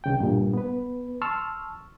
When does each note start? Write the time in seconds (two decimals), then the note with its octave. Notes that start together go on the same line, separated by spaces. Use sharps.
0.04 C2 C#3 G5
0.20 G2 A#2
0.53 B3 B4
1.22 A5 C6 C#6 E6 F6